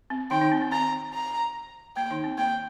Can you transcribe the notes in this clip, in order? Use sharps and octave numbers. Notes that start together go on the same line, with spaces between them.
C4
D#3 D#4 G5
D#3 D#4
C4
C4
C4 A#5
A#5
A#3 G5
D#3 D#4
C4
A#3 G5